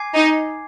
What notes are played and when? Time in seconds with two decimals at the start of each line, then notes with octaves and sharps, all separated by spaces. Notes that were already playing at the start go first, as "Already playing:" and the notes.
Already playing: G#5 D6 G#6 C7
0.15 D#4